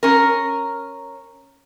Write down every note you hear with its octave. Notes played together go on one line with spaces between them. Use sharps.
C#4 A#4